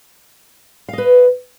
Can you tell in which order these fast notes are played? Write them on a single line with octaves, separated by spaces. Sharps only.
F5 D#5 B4